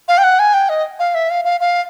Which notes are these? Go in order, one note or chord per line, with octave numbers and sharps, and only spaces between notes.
F5
G5
F#5
G#5
G5
D#5
F5
E5
F5
F5
F5